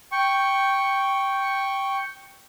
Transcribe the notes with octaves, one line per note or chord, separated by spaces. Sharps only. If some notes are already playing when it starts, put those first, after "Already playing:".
G5 C#6